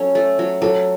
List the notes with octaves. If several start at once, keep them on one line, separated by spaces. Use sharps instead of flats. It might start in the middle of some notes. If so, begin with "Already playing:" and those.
Already playing: F#3 C#4 A4
A3
F#3
F#3 A4